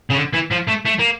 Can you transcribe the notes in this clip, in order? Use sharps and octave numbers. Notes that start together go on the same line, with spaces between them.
C#3
D3
E3
F3
A3
A3
A#3